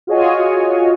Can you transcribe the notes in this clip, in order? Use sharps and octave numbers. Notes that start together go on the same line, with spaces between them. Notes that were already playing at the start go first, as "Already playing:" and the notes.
F4 F#4 G#4 C#5 D#5 G#5